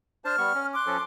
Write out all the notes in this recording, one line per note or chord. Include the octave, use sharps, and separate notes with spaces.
D4 C5 A5 F6
G3 B3 C#6
C#4
C6 D6 F#6
F3 C#4 A4